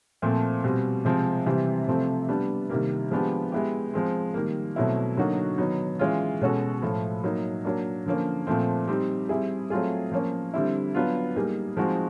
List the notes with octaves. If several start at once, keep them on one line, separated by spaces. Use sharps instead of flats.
A#2 F3 A3 C4
B2 G3 C4
C3 F3 G#3 C4
C3 E3 G3 C4
C3 F3 A3 C4
G3 B3 D4
C3 D#3 G3 A#3
F3 G#3 B3 D4 G4
G#3 B3 E4 G4
F3 G#3 C4
D#3 G3 A#3
B2 F#3 A3 C4 E4
D3 F#3 A#3 D#4 F#4
D#3 F#3 B3 D#4
E3 G#3 C#4 F4
B2 G#3 C#4 F#4 A4
A2 F3 A3
F#3 A#3 D#4
F#3 A#3 D4
D3 F3 A#3 C#4
A#2 F3 A3 C4
G3 C4 D#4 G4
G3 C4 E4 G#4
F#3 A3 C4 F4 G#4
F3 A#3 C#4
D3 G3 C4 E4
F#3 B3 D4 F4
G3 A#3 D#4 G#4
F3 G#3 C4 D#4 F#4